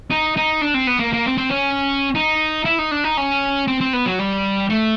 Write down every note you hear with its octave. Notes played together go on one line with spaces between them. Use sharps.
D#4
D#4
D4
C4
B3
A#3
A#3
C4
C4
C#4
D#4
E4
D#4
D4
D#4
C#4
C4
C4
B3
F#3
G3
A3